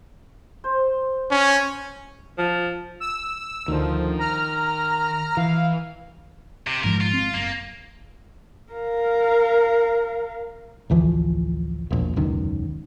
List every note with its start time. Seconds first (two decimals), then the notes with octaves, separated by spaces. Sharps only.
0.64 C5
1.31 C#4
2.38 F3
3.00 E6
3.68 D2 D#3 F3
4.19 A#5 F6
5.37 E3 F5
6.67 C3
6.84 G#1 G#2 F3 A#4
7.01 F4
7.14 C4
7.34 F#1 A#3
8.72 A#4 F5
10.90 A1 D2 E3 F3
11.91 E1 A#1
12.16 E1 C#2 F#2 D#3